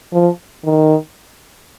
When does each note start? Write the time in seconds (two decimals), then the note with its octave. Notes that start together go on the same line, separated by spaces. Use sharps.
0.13 F3
0.64 D#3